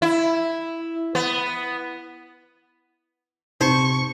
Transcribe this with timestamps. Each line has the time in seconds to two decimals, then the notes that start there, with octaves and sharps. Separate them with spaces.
0.02 E4
1.15 B3
3.61 C3 D#4 C5 C#6